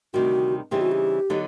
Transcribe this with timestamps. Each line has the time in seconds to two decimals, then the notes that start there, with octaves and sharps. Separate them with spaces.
0.14 D2 C3 D#3 G3 F#4
0.71 C#3 E3 G3 C4 D#4 G4
0.81 F#4
0.91 G4
1.30 D3 F#3 B3 D#4